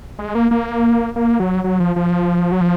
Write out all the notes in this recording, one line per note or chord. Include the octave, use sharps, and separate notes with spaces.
G#3
A#3
A#3
A#3
F#3
F#3
F3
F3
F#3
F3